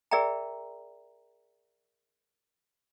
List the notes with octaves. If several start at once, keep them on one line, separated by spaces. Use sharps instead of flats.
G#4 A#4 D5 E5 G5 A#5